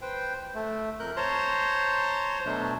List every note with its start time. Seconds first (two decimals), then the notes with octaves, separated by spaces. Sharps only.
0.02 B4 C5 G5
0.55 A3
1.00 F2 A#4 F#6 G6
1.17 C5 C#5 A5 A#5 C6
2.46 B2 F#3 A3 D4